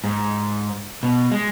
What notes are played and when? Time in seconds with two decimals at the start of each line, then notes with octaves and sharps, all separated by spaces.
0.04 G#2
1.03 B2
1.32 G#3